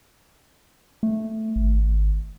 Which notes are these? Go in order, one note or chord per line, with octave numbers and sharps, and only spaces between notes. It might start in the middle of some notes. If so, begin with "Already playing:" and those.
A3
G#1